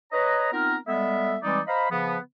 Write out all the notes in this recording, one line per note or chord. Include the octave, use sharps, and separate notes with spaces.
B4 C#5 D#5 A#5
B3 C4 D#4 F4 A#4
G3 G#3 B3 A4 E5
E3 G3 G#3 C4 D#4 D5
C5 D#5 F5 A#5 B5
C#3 F3 B3